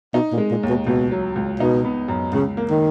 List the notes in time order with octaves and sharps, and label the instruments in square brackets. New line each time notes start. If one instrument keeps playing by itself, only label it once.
[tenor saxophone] B2 [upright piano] D#4
[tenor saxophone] A#2
[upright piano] G#3
[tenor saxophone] A#2
[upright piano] D#2
[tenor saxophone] B2
[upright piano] C#2 [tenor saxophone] B2
[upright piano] F#3
C#2
[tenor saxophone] B2 [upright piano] D#4
[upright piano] B3
F#2
[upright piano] C#2 [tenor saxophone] C#3
[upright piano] A#3
[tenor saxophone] D#3